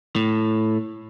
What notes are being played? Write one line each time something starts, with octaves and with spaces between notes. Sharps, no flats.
A2